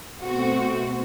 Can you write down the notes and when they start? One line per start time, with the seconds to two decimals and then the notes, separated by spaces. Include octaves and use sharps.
0.24 B2 A3 C4 F#4